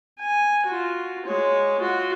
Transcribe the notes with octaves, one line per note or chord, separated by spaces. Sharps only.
G#5
F4 F#4
G#3 C#5
F4 F#4